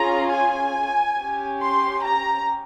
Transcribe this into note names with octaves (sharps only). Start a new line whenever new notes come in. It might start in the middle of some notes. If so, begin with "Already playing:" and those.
Already playing: C#4 F4 G#4 A#5
G#5
C#4 G4
C6
A#5